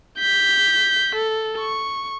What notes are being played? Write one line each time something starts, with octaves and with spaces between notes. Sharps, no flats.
G6 B6
A4
C#6